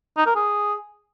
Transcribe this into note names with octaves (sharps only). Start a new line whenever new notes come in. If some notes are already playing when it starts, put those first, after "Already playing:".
D#4
A#4
G#4